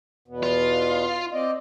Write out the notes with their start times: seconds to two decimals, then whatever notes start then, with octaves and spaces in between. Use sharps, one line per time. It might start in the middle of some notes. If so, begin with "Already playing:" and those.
0.28 E2 B2 B3
0.43 F4
1.33 C4 D5 D#5